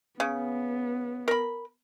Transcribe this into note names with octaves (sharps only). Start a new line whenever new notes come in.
C#3 B3
A#4 B5